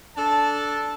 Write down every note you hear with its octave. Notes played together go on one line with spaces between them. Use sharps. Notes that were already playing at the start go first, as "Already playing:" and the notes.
D4 A4 A5